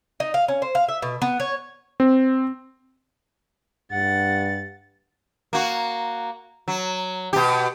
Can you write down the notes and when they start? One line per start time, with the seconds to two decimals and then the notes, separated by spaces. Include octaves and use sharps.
0.20 D#4
0.34 F5
0.48 C#4
0.62 C5
0.75 F5
0.88 E5
1.02 B2
1.22 B3
1.40 C#5
2.00 C4
3.92 G2 F#5 A6
5.53 A#3 F#4
6.68 F#3
7.33 B2 G4